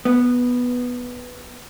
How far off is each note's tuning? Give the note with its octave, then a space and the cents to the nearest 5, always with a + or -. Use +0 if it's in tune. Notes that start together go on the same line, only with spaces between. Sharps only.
B3 -5